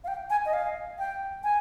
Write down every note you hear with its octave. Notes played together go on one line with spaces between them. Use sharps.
F5
G5
G#5
D#5
F5
G5
G#5